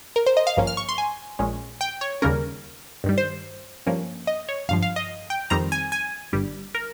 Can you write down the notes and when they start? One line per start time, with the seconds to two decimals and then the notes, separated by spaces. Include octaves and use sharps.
0.16 A#4
0.26 C5
0.37 D#5
0.47 F5
0.57 G#1 G2 F3 A#3 C#4
0.67 F6
0.77 C#6
0.89 C6
0.98 G#5
1.39 A#1 A#2 G#3 C#4
1.81 G5
2.01 C#5
2.22 D#2 C#3 G3 A#3 C#4 A#4
3.04 G2 D#3 G3
3.18 C5
3.86 G2 F3 A#3 C#4
4.27 D#5
4.49 C#5
4.68 G#1 G2 F3 F5
4.82 F5
4.96 D#5
5.30 G5
5.50 F2 D#3 G3 C4 A#5
5.72 G#5
5.92 G#5
6.33 G1 G2 G3
6.75 A#4